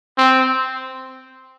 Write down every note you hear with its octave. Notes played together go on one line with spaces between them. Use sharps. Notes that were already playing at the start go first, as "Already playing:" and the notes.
C4